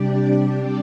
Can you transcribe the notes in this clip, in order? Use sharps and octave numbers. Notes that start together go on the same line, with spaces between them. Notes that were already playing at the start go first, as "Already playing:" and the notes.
Already playing: C3 G3 D4 G4 D5